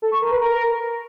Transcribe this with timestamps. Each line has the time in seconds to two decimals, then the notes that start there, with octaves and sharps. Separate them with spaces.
0.02 A4
0.12 C#6
0.21 A#4
0.31 B4
0.40 A#4